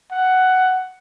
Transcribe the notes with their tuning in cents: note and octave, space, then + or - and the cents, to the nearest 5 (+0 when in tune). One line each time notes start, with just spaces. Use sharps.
F#5 +10